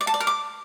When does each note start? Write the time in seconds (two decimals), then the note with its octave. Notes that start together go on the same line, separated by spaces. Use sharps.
0.01 D5
0.07 A5
0.14 D5
0.20 A#4
0.27 D6